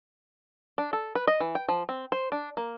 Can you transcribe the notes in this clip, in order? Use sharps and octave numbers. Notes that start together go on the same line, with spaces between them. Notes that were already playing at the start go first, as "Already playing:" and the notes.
D4
A4
B4
D#5
E3
G5
F3
C4
C5
D4
A#3